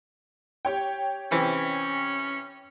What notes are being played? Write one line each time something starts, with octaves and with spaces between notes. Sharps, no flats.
G4 C#5 G5
C3 E3 C4 C#4